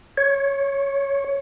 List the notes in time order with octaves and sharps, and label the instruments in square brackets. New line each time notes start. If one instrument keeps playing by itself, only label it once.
[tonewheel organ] C#5